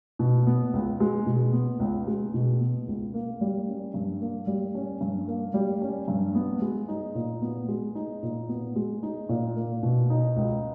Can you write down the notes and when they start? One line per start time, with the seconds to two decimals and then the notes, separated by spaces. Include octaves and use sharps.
0.19 B2
0.47 B3
0.74 C#2
1.00 G#3
1.26 B2
1.53 B3
1.80 C#2
2.07 G#3
2.34 B2
2.60 B3
2.88 C#2
3.14 A#3
3.41 G3
3.67 C#4
3.94 G2
4.21 A#3
4.47 G3
4.75 C#4
5.01 G2
5.28 A#3
5.54 G3
5.81 C#4
6.08 G2
6.35 B3
6.62 G#3
6.88 D#4
7.15 A#2
7.42 B3
7.68 G#3
7.95 D#4
8.23 A#2
8.49 B3
8.76 G#3
9.03 D#4
9.29 A#2
9.56 A#3
9.83 B2
10.10 D#4
10.37 C#2